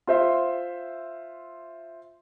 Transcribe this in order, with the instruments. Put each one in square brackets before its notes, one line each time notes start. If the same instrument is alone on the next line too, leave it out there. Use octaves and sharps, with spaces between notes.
[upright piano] F4 C5 E5